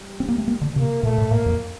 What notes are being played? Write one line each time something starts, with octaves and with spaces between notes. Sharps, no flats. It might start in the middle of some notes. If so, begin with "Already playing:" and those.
Already playing: G3
C4
A#3
A3
A#3
D3
C3 A#3
A#2 A3
A2
A2 A#3
F2